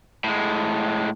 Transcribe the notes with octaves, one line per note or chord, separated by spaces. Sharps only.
A2 G#3